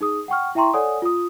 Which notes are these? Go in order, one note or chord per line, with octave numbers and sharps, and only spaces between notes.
D#4 G#4 D#6
F#5 G5 C#6 F6
E4 E5 G5 A#5 C6 C#6
A4 C#5 D5 F#5 G#5 D#6
F4 D#6